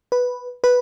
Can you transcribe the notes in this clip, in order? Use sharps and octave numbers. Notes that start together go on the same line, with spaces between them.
B4
B4